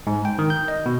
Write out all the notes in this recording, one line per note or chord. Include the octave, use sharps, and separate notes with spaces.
G#2
G5
D#3
G6
D#5
B2